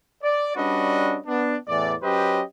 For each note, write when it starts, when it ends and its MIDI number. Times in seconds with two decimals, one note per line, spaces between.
0.22 0.52 74
0.56 1.18 55
0.56 1.18 61
0.56 1.18 62
0.56 1.18 66
0.56 1.18 71
0.56 1.18 75
1.27 1.56 59
1.27 1.56 62
1.67 1.94 40
1.67 1.94 45
1.67 1.94 52
1.67 1.94 74
2.02 2.41 54
2.02 2.41 61
2.02 2.41 67
2.02 2.41 71
2.02 2.41 72
2.02 2.41 75